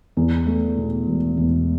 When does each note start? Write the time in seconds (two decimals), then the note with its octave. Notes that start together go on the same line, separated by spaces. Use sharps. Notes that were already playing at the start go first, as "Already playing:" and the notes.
0.17 E2
0.46 A3
0.77 B2
1.07 E1
1.37 E2